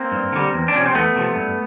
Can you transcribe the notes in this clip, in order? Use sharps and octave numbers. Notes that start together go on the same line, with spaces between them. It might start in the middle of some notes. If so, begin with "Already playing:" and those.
Already playing: A#3 C4
G2
D3 G3
E2
D4
C3 F3 C#4
C4
E2 A3 B3
C3 F3
G2